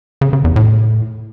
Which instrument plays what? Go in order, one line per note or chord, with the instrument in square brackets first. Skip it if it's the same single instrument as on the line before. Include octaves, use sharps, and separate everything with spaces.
[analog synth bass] C#3
C#3
E2
A2